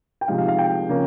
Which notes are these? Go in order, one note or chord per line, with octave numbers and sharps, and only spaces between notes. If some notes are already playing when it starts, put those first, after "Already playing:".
G5
C3 F3 G#3 D#4 F5
F5
F5
G5
C#3 F3 A#3 C#4